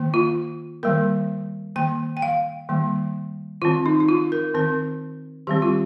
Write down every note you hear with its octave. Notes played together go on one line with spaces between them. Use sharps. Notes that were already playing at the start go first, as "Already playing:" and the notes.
Already playing: D#3 A#3
F4
D#3 G3 A#3 A#4
D#3 A#3 G5
G5
F5
D#3 G3 A#3
D#3 C4 F4
D#4
D#4
F4
A#4
D#3 C4 A#4
D#3 G3 C4 G4
F4